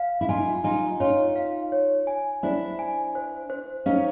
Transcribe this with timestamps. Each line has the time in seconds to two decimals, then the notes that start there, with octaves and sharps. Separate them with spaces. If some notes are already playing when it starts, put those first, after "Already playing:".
Already playing: F5
0.21 E4
0.29 D#4 F4 G#5
0.64 D#4 F4 G#5
1.00 D#4 F4 C#5
1.36 F5
1.72 C#5
2.07 G#5
2.43 D4 E4 C5
2.79 G#5
3.15 C5
3.50 C5
3.86 C#4 D#4 F5